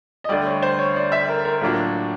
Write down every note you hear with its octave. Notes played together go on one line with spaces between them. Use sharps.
D#5
D2 D3 G3 D5
C#5
C5
C#5
D5
E5
A#4
A#4
A2 F#3 A#3 D4 F4 F#4